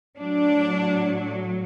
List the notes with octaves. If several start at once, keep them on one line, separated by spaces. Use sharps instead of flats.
A2 F#3 D4